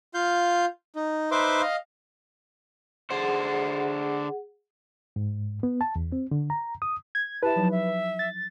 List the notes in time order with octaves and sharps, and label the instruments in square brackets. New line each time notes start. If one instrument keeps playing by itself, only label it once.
[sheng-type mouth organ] F4 F5 G6
D#4
D#4 B4 C5 E5 C6 D6
D#5 F5
[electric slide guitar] D3 C5 [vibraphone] G#4 F#5
[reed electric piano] G#2
B3
A5
E2
C4
D3
A#5
D#6
[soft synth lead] G#6
[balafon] E4 G4 E5 [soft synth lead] B4 [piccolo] A5
[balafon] F3 F#3 D#4
[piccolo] E5
[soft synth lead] A6